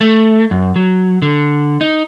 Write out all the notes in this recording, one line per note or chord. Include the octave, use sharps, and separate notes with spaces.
A3
F#2
F#3
D3
D#4